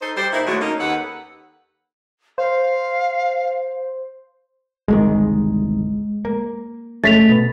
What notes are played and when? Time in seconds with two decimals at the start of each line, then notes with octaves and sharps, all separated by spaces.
0.02 D#4 A4 C5
0.16 G3 G4 C5
0.32 A#2 A#3 D#4 E4
0.46 D3 D#3 F#3 G#3 A3 F#4
0.61 A#3 C#4 D#4
0.80 D#2 D#3 A4 B4 F#5
2.38 C5 F5
4.88 G1 C2 D#3 G#3
6.25 A#3
7.04 F#1 G#3 A3 C#4 A6 B6 F7
7.29 B2 B3